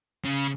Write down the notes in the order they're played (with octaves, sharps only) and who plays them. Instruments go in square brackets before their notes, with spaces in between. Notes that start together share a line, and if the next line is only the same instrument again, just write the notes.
[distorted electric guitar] C#3